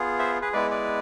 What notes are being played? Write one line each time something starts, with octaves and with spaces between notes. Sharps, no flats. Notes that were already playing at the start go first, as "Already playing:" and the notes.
Already playing: B3 F4 G#4
C5 E5
G#4 B4
G#3 B3 E4 B4 D5
B4 D5